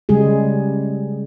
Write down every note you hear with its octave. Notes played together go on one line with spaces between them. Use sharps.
C#3 G3 G#3 G#4